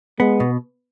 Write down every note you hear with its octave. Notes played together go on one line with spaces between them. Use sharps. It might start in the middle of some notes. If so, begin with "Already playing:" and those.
G#3 B3
B2